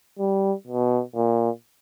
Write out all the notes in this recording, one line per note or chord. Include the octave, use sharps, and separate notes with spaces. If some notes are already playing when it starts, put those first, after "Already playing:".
G3
B2
A#2